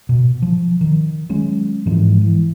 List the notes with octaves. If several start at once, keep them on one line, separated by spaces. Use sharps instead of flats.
B2
F3
D#3
F#3 G#3 C#4
G#2 E3 F3 G#3
E3